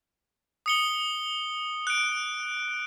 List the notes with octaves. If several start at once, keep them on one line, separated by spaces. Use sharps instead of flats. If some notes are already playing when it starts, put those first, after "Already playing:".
D#6 C#7 G7
F#6 D7